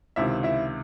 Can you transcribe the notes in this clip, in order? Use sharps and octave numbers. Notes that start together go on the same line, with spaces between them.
C#2 C3 D#3 E4 E5
E4 E5